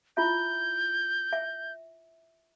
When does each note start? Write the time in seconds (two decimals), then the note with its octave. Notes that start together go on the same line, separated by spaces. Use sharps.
0.17 E4 F4 E5 G6
1.33 E5